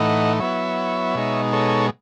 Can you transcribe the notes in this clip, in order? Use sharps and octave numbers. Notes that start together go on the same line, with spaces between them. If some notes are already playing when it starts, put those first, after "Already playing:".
Already playing: A2 E3 A3 D#4 D#5 F#5
F#3 B3 E4 C#5 E5
B2 G#3 D#4
A4 C#5